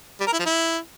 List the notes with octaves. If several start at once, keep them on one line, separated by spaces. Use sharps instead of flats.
G3
A#4
E4
F3
E4